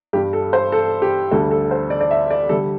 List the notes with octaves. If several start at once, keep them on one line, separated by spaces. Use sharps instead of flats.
G2 G3 G4
A4
C5
A4
G4
D2 D3 G3 A4
A4
C5
D5
D5
E5
D5
D3 G3 A4